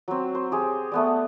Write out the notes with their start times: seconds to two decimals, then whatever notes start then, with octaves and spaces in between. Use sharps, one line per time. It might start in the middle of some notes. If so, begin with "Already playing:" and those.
0.08 F#3 C4
0.35 C5
0.52 G4 G#4 C5
0.92 A3 B3 D5